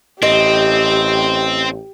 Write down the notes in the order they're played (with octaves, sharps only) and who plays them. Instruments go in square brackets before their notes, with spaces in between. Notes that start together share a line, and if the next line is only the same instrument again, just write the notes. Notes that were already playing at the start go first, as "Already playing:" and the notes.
[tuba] A1 [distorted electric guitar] C4 [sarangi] G4 [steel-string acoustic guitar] D#5